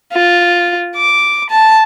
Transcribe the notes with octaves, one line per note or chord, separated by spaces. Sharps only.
F4
D6
A5